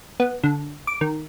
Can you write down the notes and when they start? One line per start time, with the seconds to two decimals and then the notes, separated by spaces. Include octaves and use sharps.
0.20 B3
0.44 D3
0.87 D6
1.01 D#3